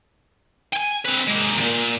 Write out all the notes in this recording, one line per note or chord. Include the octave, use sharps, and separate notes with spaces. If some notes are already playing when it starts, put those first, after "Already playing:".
G5 G#5
C4 B4
G#3 A#3
D2 A#2